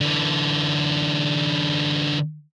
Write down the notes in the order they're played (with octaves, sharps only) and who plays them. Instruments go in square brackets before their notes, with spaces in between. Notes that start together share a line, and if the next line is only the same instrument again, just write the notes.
[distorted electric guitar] D3 E3